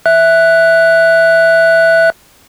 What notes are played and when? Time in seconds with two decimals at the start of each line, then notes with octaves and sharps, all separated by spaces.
0.06 E5 F#6